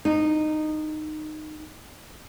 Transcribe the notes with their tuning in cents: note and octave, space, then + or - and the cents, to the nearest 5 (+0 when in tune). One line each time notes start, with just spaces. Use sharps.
D#4 -15